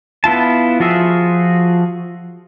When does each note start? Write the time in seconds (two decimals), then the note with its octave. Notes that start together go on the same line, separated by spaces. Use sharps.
0.24 B3 E4 F4 A5
0.80 F3 F4 F#4 G#4 E5